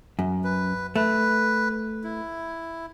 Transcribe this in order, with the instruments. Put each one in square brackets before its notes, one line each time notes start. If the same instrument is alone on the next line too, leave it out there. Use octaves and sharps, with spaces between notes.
[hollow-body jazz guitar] F#2
[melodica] B4
[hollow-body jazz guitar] A3 [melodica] B4
[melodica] E4